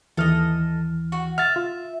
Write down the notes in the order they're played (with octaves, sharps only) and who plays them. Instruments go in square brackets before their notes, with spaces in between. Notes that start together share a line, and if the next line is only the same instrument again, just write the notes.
[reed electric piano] D#2 E3 F6 [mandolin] A4 D#5
[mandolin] F#4
[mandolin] E5 [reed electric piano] F6 A6
[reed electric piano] F4